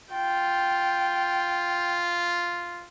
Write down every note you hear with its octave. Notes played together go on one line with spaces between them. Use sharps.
F4 G5